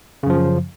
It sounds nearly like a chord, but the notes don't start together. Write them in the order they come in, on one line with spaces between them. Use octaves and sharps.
C#3 F#2 F3